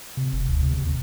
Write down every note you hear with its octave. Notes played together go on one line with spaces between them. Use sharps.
C3
F1
D2
C3
C3
D#2